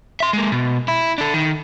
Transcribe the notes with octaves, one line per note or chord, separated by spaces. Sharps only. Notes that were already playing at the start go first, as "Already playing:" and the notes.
E5 C6
G#3 A#3
B2
E4
D4 A4
D#3